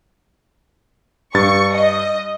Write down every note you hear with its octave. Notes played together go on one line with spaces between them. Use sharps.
G2 C#6 A6
D#5